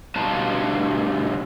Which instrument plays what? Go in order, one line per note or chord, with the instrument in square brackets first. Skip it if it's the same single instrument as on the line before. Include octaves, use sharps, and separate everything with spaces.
[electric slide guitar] G2 B2 D4 F4 A5 A#5